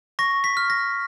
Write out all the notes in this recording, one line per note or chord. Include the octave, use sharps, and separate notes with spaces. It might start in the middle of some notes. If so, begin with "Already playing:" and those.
C#6 A#6
B6
F6
A#6